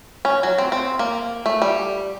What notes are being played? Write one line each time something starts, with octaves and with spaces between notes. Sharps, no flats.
C#4
F#3
C4
C4
A#3
A3
G3